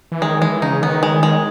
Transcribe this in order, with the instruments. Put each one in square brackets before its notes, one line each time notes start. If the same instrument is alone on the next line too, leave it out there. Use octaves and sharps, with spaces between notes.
[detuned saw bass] E3
[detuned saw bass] D#3 [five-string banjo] G#3
[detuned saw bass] E3 [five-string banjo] G#3
[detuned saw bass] C#3 [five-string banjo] D#4
[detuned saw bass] D#3 [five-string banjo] B3
[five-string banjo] G#3
G#3